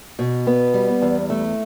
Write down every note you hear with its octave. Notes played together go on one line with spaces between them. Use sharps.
B2
B3
G3
E2
A3